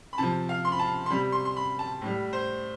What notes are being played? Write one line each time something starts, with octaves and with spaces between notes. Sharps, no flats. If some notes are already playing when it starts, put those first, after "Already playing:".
B5
C3 F3 A5
F5
C6
B5
A5
C6
C3 G3 B5
C6
C6
B5
A5
A2 G3
C5